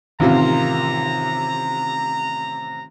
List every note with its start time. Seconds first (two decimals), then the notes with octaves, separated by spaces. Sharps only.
0.20 A1 C3 D#3 F4 F5 A#5